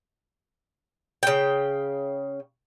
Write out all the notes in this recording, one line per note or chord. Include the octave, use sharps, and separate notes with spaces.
C#3 G5